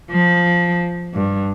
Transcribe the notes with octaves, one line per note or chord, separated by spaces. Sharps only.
F3
G2